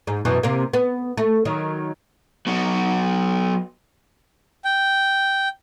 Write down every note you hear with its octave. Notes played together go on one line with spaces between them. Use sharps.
G#2
F#2 B2 E3
C3 A#3
B3
A3
D#3 F#3
F#3 B3
G5